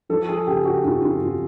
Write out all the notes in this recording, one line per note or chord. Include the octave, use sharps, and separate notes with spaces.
F3 A4
G#4
C#3 G4
F#4
F2 F4
F4
F2 F#4